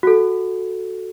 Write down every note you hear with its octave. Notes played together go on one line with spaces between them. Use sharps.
F#4 A4